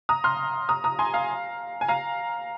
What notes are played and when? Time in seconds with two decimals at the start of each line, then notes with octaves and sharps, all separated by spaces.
0.09 A#5 D#6
0.24 C6 F6
0.69 A#5 D#6
0.84 A#5 D#6
0.99 G#5 C6
1.14 F5 A#5
1.81 G#5
1.88 F5 A#5